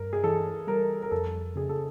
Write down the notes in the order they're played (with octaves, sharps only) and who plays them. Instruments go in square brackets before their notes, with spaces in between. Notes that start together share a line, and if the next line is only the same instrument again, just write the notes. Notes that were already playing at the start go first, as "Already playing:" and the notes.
Already playing: [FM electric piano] G2 [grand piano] A#4
[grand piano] G#4
[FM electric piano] E3 [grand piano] A4
[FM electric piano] G3 [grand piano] A#4
[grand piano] A#4
[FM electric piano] F2 [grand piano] A4
[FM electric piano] C#3 [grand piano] G#4
[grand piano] A4